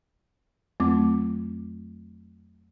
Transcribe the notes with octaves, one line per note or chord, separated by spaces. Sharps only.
F2 F#3 A3 C4 D6